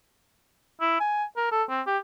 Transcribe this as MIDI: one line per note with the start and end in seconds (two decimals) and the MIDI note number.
0.81 0.98 64
1.00 1.24 80
1.37 1.51 70
1.51 1.63 69
1.70 1.81 60
1.87 1.98 67